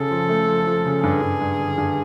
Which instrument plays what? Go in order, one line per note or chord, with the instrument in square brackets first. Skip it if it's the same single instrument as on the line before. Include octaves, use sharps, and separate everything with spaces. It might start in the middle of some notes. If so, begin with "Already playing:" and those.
Already playing: [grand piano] C#3 [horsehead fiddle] A4
[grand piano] F3
A3
F3
F3
C#3
[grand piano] G2 [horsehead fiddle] G#4
[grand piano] G2
G2
D3
G2